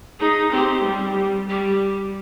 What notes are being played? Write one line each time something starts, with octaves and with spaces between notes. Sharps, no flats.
D#4 G#4
C4 G4
G3
G3
G3 G4